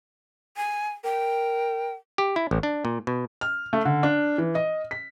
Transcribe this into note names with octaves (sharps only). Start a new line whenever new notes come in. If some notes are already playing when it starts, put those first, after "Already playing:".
G#5
A#4 G5
G4
E4
A1
D4
A#2
B2
F6
A3
D3
D4
E3
D#5
B6